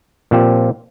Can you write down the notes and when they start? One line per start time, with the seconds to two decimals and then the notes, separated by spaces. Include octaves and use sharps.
0.31 A#2 F3 C4 G4